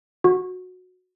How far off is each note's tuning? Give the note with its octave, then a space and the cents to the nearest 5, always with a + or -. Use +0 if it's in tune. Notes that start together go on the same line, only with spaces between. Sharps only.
F#4 -15